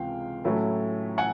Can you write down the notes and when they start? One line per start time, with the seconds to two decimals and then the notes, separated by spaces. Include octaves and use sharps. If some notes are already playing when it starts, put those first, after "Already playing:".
Already playing: C#2 C3 E3 G#3 F5 G5
0.44 A2 F#3 A3 C#4 E4
1.18 F#5 G#5